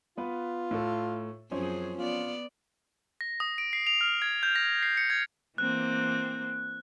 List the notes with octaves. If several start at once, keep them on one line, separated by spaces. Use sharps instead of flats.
B3 F4 B4
A2 A4
F#2 F3 C4 C#4 G#4
B3 F4 D5
A#6
D#6
D7
C7
F7
F6
G#6
G6
A#6
C7
C#7
G#6
E3 A#3 C4 F#6